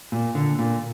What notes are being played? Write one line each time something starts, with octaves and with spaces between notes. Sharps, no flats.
A#2
D3
A#2